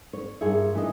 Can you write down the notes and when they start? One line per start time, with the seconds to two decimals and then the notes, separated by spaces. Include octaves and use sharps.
0.13 C#5
0.41 G2 A#3 F4 G#4 C#5 E5
0.74 G2 E3 C#4 A4 D#5